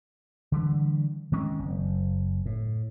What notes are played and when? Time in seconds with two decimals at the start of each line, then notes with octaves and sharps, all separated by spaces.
0.52 D3 E3 G3
1.32 D#3 G#3 C4 C#4
1.59 F#1
2.46 A2